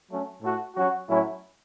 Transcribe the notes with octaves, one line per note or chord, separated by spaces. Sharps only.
F#3 A3 C#4
A2 A3 F#4
F#3 C#4 F#4
A2 F#3 C#4 E4